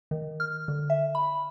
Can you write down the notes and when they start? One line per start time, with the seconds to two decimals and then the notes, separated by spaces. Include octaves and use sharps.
0.11 D#3
0.40 F6
0.68 D3
0.90 E5
1.15 B5